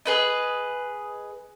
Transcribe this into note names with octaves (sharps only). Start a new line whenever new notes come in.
G#4 B4 D#5